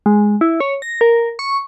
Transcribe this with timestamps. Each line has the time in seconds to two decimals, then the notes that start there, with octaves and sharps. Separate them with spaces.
0.06 G#3
0.41 E4
0.60 C#5
0.82 A#6
1.01 A#4
1.39 C#6